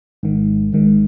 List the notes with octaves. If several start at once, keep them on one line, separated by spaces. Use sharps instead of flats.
G#1 G#2 D#3
G#1 G#2 D#3